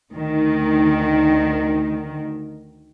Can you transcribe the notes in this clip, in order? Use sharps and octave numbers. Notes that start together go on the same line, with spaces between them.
D2 D#3